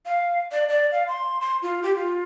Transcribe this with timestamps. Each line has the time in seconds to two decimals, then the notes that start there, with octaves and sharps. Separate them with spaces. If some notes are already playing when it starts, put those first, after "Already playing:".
0.06 F5
0.52 D5
0.69 D5
0.92 F5
1.08 C6
1.41 C6
1.62 F4
1.83 G4
1.95 F4